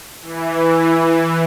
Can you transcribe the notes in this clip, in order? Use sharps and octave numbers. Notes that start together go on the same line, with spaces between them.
E3
E3